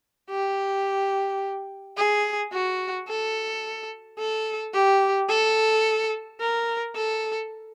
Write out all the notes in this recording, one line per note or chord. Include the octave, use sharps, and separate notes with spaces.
G4
G#4
F#4
A4
A4
G4
A4
A#4
A4